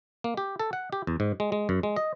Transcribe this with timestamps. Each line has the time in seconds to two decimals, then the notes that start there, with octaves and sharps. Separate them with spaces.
0.24 A#3
0.37 G4
0.60 A4
0.73 F#5
0.93 G4
1.07 E2
1.20 G#2
1.40 G#3
1.52 G#3
1.69 F#2
1.83 G#3
1.96 D#5